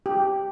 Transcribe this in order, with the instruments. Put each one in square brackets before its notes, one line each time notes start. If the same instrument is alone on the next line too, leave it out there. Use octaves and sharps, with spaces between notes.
[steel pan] G4